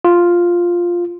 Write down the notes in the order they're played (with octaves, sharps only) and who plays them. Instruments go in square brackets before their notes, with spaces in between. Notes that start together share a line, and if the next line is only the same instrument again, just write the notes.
[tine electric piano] F4